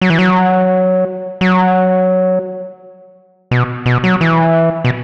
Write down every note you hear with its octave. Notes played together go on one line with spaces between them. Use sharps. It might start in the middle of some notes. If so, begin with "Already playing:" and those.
F#3
E3
F#3
F#3
B2
B2
F#3
E3
B2